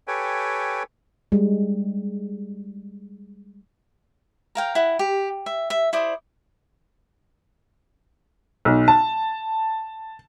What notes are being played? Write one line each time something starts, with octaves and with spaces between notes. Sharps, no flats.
G4 A4 B4 C#5 G5 G#5
G3 G#3
A#4 F5 G5
E4 F#5
G4
E5
E5
E4 C5 D5 D#6
B1
A5